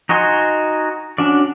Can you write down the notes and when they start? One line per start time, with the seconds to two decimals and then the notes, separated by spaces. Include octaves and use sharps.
0.09 D#4 F#4 D#5 G#5 C6
1.18 C#4 D4 F#4 D5